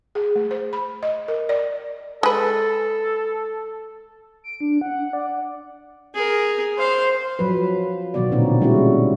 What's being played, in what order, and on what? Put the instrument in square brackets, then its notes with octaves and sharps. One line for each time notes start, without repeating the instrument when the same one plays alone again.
[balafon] G#4
A3
C5
B5
D#5
A#4
D5
[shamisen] G#3 B4 [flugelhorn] A4
[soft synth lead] D7
D4
F#5
D5
[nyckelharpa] G#4 A#4
[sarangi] C5 [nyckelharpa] F5
[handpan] F3 F#3 B4
B2 D#3 F#3 B3 F#4 D5
A#2 D3 C4 D#4 F4 F#4
G3 G#3 A#3 C#4 E4 F#4